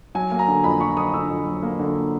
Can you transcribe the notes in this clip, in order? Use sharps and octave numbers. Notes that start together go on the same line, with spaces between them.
F#3 G#5
A#3
A#5
D3
F2 B5
F#3 C#6
A#3 D#6
D3 E6
F2
F#3
A#3
D3